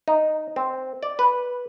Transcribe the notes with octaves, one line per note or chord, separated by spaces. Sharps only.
D#4
C4
D5
B4